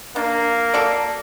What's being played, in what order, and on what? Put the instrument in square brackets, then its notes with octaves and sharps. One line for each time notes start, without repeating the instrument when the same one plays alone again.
[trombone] A#3 [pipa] D4
[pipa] F#4 A4 D5